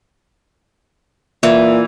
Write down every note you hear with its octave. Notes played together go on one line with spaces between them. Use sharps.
A#2 E3